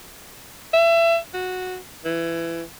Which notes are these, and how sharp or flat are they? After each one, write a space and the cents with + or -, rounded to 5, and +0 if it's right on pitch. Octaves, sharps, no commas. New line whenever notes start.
E5 +30
F#4 -10
E3 +20